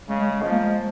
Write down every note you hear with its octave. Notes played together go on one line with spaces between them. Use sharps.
C#3 G#3
G#3
G#3
F3 G#3
A#3
G#3